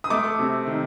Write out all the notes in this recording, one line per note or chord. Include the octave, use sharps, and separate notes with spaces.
D#6
A3 D6
C3
D#3